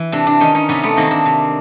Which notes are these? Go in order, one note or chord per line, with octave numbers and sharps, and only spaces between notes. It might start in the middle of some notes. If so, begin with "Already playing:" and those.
Already playing: E3
C3 C4 D4
C4 D4
D#3 C#4 D#4
C#4 D#4
C3 B3 C#4
A3 B3
D#3 A#3 C4
C4 D4
C3